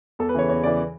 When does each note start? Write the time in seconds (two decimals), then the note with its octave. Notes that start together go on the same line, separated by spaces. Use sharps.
0.19 E2 A4
0.29 B4
0.35 C#3 E3 C#5
0.49 E2 C#5
0.64 C#3 E3 D5